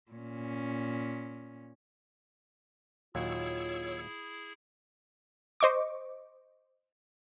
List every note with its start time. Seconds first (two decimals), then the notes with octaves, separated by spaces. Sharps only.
0.12 A#2 C#4
3.15 D#2 A#2 F#3 E4 F4 G#4 C#5 E6
5.60 C5 D#5 C#6 D6